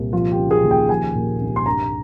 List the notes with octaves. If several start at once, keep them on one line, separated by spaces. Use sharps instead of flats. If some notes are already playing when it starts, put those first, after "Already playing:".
Already playing: C2 A#2
F3 F4
G4
C#3
G#4
D#2
G5
F3 G#5
A#2
C2
C6
G2 A#5